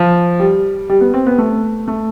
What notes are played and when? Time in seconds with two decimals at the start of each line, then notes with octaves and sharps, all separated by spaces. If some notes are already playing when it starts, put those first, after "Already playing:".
Already playing: F3
0.40 G3
0.89 G3
1.01 B3
1.14 C4
1.27 B3
1.38 A3
1.88 A3